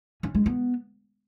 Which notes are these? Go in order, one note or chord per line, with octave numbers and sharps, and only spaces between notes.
C#4
G#3
B3